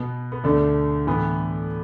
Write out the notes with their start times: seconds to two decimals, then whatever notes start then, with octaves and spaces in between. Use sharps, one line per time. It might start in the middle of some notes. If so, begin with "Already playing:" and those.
Already playing: B2 B3
0.32 B3
0.44 D2 D3 A3 D4
1.07 A2 E3 B3